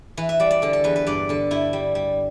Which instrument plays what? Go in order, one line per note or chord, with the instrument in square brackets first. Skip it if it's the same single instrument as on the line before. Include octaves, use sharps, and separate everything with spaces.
[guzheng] E3 B4
E5
G3 D5
D5
D3 A4
A4
E2 B4
B4
G2 D5
D3 A4
G2 E4
G3
G3